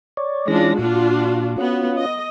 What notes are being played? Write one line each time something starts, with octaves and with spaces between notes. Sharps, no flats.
C#5 D5
E3 G#3 C#4 D4 F4 A#6
A#2 D4 F4 F#4
B3 C#4 F4 F#4
D#5